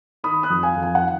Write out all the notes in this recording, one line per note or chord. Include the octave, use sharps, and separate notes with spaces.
D#3 B5 D#6
D#6 F#6
F2
F5 G#5
F2
G#5
F#5
D#3